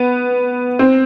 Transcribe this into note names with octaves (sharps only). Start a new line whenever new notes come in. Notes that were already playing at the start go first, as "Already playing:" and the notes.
Already playing: B3
C4